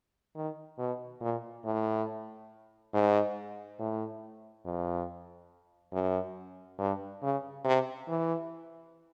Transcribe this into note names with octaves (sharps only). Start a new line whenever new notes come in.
D#3
B2
A#2
A2
G#2
A2
F2
F#2
G2
C#3
C3
E3